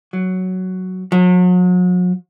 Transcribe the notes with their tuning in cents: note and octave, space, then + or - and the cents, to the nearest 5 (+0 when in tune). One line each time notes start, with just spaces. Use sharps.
F#3 +5
F#3 -40